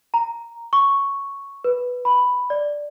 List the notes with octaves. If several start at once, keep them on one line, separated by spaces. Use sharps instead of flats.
A#5
C#6
B4
B5
D5